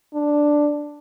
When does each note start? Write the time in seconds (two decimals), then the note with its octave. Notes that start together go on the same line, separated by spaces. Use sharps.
0.14 D4